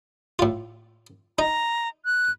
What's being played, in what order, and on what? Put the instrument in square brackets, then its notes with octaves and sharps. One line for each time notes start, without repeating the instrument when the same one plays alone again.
[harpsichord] A2 F4
[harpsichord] D#4 [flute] A#5
[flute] F#6